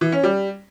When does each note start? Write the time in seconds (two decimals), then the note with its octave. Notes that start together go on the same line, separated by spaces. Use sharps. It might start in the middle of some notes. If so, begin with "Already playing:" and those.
0.01 E3
0.12 C#4
0.23 G3